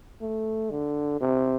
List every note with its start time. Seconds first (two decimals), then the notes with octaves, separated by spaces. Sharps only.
0.21 A3
0.71 D3
1.21 C3